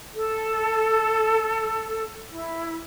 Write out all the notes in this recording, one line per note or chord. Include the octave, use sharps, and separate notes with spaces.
A4
E4